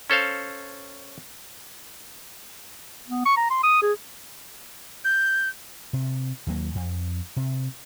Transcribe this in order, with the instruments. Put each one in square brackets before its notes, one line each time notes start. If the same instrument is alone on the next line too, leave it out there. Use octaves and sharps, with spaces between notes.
[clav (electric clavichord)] C#4 A4 C5 F5
[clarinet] B3
C#6
A#5
C6
D#6
G#4
[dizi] G6
[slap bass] C3
D#2 F#3 A#3
F2
C3